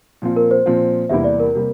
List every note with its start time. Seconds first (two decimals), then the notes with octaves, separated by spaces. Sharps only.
0.22 A#2 F3 C4 F4
0.36 A#4
0.51 C5
0.66 A#2 F3 C4 F4
1.09 E2 C3 G3 A#3 E4 E5
1.24 D5
1.40 A#4
1.55 C3 G3 A#3